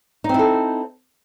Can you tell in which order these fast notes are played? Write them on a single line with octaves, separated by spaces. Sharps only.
D#4 C4 E4 A4